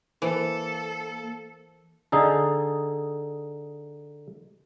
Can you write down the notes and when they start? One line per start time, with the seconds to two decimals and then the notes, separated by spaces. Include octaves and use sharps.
0.22 E3 A#3 A4 A#4 C5
2.12 D3 D#4 G#4 A4